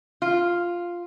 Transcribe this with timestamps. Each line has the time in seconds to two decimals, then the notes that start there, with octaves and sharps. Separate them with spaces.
0.22 F4